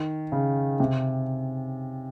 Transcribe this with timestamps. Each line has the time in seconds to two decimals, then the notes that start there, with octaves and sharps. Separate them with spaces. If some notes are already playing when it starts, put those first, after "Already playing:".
Already playing: D#3
0.32 C#3
0.80 C3